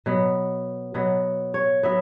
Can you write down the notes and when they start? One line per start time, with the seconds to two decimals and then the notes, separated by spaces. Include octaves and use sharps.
0.06 B2 F#3 B3
0.94 B2 F#3 B3
1.54 C#5
1.83 F#3 B3 E5